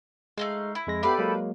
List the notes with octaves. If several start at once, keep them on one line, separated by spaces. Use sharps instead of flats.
G#3 A3 D#4 F5
E4
F2 G#3 A#6
B3 G4 A4 B4 D5 E5 F5 B5
F#3 G#3 A#3